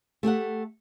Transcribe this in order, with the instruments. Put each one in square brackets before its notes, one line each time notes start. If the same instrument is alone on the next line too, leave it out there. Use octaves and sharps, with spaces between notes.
[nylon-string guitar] A3 G4 A4 F#5